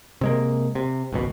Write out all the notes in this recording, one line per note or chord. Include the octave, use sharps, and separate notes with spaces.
C3 G#3 A#3
C3
G#1 C#2 B2